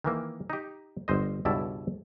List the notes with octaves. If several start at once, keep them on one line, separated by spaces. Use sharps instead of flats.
D#3 E3 A#3
D#4 G4
G1 C5 D#5
C#2 G2 B2 E4 D5 A5